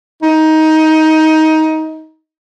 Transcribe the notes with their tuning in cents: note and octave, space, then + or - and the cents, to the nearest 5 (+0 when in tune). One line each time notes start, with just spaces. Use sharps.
D#4 +15